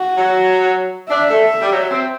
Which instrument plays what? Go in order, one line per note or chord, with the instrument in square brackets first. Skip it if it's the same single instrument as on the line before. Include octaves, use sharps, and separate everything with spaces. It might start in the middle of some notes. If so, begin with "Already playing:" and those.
Already playing: [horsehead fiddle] F#4
[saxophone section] F#3
[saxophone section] D4 [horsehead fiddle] E5
[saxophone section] A3
G3
F#3
C4